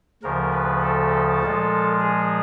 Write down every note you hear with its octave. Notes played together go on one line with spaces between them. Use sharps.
D2 C#3 F3 A#4
B4
A4
A#2 F3 G#3
G#4